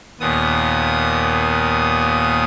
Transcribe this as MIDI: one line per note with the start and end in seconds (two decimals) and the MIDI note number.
0.20 2.45 39
0.20 2.45 46
0.20 2.45 59
0.20 2.45 87